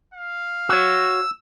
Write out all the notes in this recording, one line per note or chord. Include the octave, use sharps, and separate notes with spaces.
F5
F#4 C#5 E6